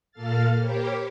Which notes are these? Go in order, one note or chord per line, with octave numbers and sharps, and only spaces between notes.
A#2 A#3 A4 F5 F6 A6
G4 A#4 C5 C#5 B5 D6